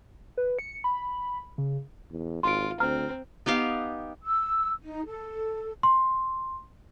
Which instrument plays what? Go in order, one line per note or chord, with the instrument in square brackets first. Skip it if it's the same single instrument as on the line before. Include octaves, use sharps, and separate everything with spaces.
[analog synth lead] B4
C#7
B5
C#3
[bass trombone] E2
[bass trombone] G#1 [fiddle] F4 [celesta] C6 D7
[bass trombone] D2 [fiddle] C4 [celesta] A#5 F6
[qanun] B3 D#4 G4 F5
[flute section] E6
D#4
A4
[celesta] C6